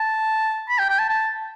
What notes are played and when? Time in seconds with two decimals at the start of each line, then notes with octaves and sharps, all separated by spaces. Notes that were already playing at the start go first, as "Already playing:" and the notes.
Already playing: A5
0.69 B5
0.79 G5
0.89 G5
0.99 A5
1.09 A5